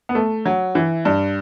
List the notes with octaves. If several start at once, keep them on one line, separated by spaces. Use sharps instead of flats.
B3
A3
F#3
E3
G2